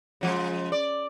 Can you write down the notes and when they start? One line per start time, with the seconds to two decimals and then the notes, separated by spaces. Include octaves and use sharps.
0.21 C#3 F3 G#3
0.72 D5